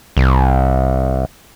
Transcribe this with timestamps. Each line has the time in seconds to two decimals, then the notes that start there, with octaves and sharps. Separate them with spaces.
0.17 C2